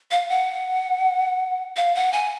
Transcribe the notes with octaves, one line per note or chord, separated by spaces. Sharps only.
F5
F#5
F5
F#5
G#5